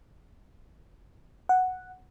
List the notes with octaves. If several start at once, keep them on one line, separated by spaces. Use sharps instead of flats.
F#5